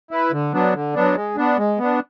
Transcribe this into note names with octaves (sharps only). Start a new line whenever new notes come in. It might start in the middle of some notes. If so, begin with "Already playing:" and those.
E4 B4
D3
F#3 B3 D4
D3
F#3 B3 D4
G#3
B3 D4
G#3
B3 D4